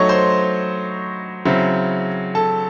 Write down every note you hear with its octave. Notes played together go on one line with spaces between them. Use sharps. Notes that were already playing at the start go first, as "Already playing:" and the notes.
Already playing: F#3 A3 D#4 C#5 C#6
C5 C6
C#3 F#3 C4 E4
A4 A5